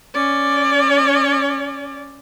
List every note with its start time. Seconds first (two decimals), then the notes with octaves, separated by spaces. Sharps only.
0.15 C#4 D5